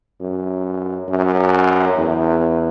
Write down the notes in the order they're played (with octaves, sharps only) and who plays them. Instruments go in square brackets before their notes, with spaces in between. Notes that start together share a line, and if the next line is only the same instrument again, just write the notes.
[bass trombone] F#2
F#2
E2